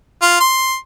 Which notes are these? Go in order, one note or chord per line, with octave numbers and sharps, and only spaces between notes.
F4
C6